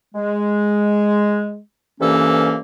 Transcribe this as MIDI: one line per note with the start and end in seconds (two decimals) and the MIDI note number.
0.15 1.60 56
2.01 2.60 36
2.01 2.60 43
2.01 2.60 52
2.01 2.60 58
2.01 2.60 61
2.01 2.60 69